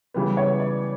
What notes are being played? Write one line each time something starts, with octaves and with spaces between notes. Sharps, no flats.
C#3 E3 G3 B3
C#5
D5